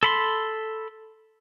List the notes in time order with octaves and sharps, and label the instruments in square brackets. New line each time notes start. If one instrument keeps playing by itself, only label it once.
[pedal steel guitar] A4 B5 C6